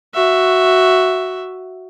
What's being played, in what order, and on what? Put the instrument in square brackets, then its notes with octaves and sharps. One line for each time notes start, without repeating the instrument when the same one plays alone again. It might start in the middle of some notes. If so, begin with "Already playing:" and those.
[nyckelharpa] F#4 E5